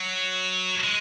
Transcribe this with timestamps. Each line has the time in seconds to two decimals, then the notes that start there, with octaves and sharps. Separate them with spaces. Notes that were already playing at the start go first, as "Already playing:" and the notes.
Already playing: F#3
0.83 G#3